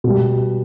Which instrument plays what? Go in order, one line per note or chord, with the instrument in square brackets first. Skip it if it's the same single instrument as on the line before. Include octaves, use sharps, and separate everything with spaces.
[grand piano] B2 G3